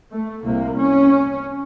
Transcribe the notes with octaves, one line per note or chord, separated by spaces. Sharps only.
A3
C2 C3 A#3
C#4